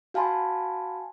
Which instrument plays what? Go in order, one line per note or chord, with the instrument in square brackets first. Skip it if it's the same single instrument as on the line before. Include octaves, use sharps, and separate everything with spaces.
[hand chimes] F#4 F5 G#5 A5 B5 C6